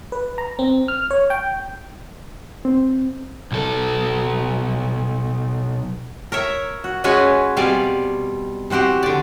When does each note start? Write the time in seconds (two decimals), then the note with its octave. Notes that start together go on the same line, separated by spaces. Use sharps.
0.12 B4
0.38 A#5
0.59 C4
0.88 F6
1.11 C#5
1.30 G5
2.65 C4
3.52 B1 A4
6.32 A#4 C#5 E5
6.84 F#4
7.04 G#3 C#4 F#4 B4 C#5 G#5
7.57 B2 G3 C4 D5 F5 G#5
8.70 E3 C4 F#4 G4 C5
9.03 D3 D5